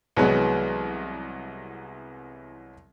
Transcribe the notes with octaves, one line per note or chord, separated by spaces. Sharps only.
C2 E3 F#3 G#3 B3